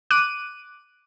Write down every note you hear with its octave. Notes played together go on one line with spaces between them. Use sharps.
D6 F#6 D#7